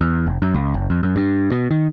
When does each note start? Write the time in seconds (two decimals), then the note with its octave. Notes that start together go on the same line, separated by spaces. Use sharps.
0.01 E2
0.27 F1
0.42 F#2
0.54 C#2
0.74 F#1
0.90 F2
1.03 F#2
1.16 G2
1.52 B2
1.71 D#3